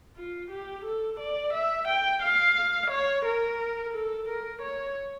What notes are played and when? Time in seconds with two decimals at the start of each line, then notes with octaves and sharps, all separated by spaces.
0.17 F4
0.51 G4
0.85 A4
1.20 D5
1.54 E5
1.88 G5
2.23 F5
2.91 C#5
3.25 A#4
3.94 A4
4.29 A#4
4.62 C#5